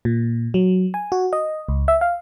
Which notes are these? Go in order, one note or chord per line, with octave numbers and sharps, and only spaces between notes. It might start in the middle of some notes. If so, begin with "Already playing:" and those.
A#2
F#3
G#5
F#4
D#5
C#2
E5
F5